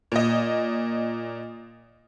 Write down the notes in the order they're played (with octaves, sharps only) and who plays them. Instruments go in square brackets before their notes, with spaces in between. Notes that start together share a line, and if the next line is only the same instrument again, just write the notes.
[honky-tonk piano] A#2 D#5